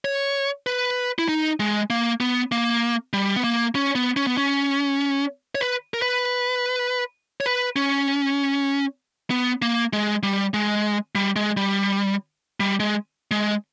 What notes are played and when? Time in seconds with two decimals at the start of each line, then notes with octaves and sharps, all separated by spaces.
0.05 C#5
0.67 B4
1.19 E4
1.29 D#4
1.60 G#3
1.90 A#3
2.20 B3
2.52 A#3
3.13 G3
3.36 B3
3.44 A#3
3.75 C#4
3.95 B3
4.16 C#4
4.27 B3
4.37 C#4
5.55 C#5
5.60 B4
5.94 A#4
6.02 B4
7.41 C#5
7.46 B4
7.76 C#4
9.30 B3
9.62 A#3
9.93 G#3
10.23 G3
10.54 G#3
11.15 G3
11.36 G#3
11.57 G3
12.60 G3
12.80 G#3
13.31 G#3